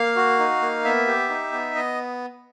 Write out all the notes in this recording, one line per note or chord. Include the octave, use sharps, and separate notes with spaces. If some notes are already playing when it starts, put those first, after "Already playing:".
Already playing: A#3 F5
F#4
D#4
A#3
B3 E5
G4
D#4
B3
B3 D#5